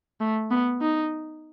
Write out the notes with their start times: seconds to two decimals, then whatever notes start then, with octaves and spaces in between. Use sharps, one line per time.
0.21 A3
0.51 B3
0.82 D#4